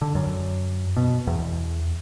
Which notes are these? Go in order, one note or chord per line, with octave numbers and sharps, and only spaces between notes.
D3
F#2
B2
E2